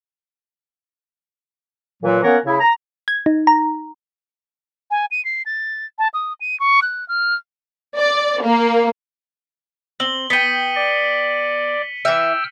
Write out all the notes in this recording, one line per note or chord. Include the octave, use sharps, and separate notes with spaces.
A#2 E3 F#3
A#3 B3 C#4 A#4 C#5 F#5
C#3 E4
A#5
G#6
D#4
A#5
G#5
D#7
C7
A6
A5
D#6
D#7
C#6
F#6
F6
D5
A#3
C4 F#7 G7
B3 G5 B6 C#7 D#7
D5
E3 E5 G5 E6 F6